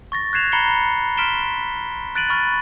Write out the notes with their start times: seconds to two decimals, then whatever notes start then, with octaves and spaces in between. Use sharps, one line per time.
0.12 C#6 A6 A#6
0.33 F#6 G#6 C7 E7 F7
0.52 A#5 B5 C7 C#7 G7
1.17 C6 F6 B6 D7 E7 G7
2.15 F#6 A6 D7 D#7 F#7
2.29 B5 C#6 F6 F#6 A6